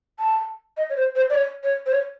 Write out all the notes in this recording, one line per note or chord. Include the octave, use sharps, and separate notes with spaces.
A5
D#5
C#5
C5
C5
D5
C#5
C#5
C5
C#5